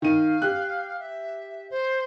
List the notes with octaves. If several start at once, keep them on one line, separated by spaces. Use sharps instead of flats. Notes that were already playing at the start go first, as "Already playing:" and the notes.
D#3 F5 D#7
G4 F#6
E5
C5